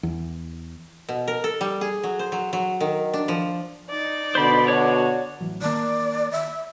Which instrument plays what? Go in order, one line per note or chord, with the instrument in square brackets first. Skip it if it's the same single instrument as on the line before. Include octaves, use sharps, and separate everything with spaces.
[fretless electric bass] E2
[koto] B2
A#4
A4
G3
G#4
F#3
C5
F#3
F#3
D#3
D4
F3
[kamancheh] D#4 D5
[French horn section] B2 D3 [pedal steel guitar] C5 B5
[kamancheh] F#4 [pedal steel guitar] C#5 D5
[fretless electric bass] A1 E3 F#3
[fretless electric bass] D#3 A#3 [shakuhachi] D5
[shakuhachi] E5